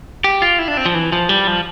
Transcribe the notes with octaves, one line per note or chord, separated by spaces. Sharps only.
G4
F4
E4
D4
C4
F3
E3
F3
G3
F3